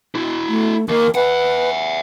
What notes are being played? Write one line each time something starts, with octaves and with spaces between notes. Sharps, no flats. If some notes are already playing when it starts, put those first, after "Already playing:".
E4 F#4
A3
D#2 A#3 A#4
B4 E5 F#5